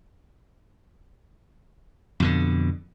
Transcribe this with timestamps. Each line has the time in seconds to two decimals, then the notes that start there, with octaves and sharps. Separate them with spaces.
2.20 F2 B2 D3